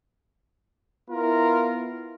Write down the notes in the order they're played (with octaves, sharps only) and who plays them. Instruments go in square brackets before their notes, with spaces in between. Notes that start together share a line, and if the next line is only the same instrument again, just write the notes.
[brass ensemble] B3 E4 F4 A#4